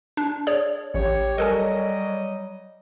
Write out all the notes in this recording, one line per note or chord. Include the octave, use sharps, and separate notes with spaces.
D4
G#4 C#5 D5
A1 G4 C#5
F#3 G3 A4 A#4 D#5 G#5